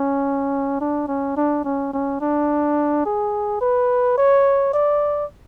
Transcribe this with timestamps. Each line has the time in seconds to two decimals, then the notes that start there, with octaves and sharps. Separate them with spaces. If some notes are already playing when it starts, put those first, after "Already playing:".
Already playing: C#4
0.81 D4
1.08 C#4
1.37 D4
1.64 C#4
1.93 C#4
2.21 D4
3.06 G#4
3.61 B4
4.18 C#5
4.73 D5